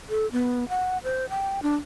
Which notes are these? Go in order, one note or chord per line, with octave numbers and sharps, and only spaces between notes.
A4
B3
F#5
C5
G5
D4